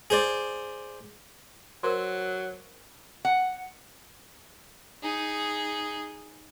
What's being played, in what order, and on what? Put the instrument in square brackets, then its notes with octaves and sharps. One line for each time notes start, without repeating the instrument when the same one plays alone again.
[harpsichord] G#4 C5 D5
[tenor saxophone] F#3 [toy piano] A#4 C5 C6
[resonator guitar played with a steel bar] F#5
[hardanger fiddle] D#4 G#4